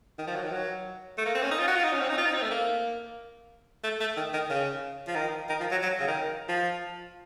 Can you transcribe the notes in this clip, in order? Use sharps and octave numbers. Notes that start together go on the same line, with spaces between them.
D#3
F3
F#3
D#3
F#3
A3
A#3
C4
C#4
D#4
F4
F#4
F4
D#4
C#4
C4
D#4
F4
D#4
C4
A3
A#3
A3
A3
D#3
D#3
C#3
F3
D#3
D#3
F3
F#3
F#3
C#3
D#3
F3